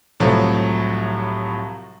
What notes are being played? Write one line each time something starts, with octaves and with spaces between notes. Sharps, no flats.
C2 A2 F3 F#3